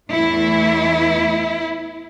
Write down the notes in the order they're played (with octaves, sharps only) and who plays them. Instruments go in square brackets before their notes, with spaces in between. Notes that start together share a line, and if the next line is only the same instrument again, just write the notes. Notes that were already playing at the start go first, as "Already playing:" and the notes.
[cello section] E2 E3 A3 E4